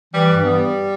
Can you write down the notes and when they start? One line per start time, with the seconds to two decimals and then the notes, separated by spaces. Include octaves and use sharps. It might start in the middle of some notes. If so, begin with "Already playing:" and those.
0.13 E3 G3
0.28 G2
0.43 G3 B3